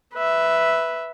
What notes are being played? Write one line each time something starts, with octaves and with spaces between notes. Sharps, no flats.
B4 E5